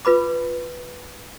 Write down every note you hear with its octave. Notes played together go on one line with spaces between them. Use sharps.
F4 B4 B5 D6